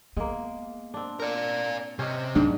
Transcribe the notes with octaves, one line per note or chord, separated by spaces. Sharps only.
G#3 A#3 B3
C4 D4
A#4 D5
C3 C#4 D#5
G#2 F#3 C4 D4